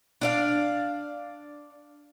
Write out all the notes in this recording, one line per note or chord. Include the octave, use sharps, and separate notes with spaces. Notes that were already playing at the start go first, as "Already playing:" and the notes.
D4 D5 F5